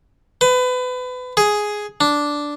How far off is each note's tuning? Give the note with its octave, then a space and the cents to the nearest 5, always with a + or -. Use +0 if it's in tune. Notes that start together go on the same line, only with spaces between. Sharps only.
B4 +30
G#4 +5
D4 -5